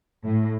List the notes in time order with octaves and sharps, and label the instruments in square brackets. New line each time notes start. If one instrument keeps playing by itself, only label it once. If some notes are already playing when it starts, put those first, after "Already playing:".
[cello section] A2